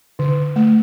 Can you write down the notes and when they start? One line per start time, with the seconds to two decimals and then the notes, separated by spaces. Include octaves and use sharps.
0.19 D3
0.56 A3